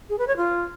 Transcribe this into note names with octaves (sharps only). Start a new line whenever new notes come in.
G#4
B4
C#5
F4